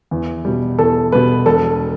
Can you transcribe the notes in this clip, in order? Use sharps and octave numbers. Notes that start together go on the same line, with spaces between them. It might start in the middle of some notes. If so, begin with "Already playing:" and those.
E2
B2 G3
E2 A4
B2 G3 B4
E1 A4